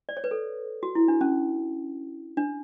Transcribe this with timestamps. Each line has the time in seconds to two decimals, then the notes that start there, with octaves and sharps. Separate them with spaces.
0.09 D5
0.17 C#5
0.24 B4
0.31 A4
0.83 F#4
0.95 E4
1.08 D4
1.21 C#4
2.37 D4